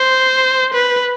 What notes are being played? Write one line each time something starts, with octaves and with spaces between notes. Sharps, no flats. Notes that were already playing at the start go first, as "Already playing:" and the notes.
Already playing: C5
B4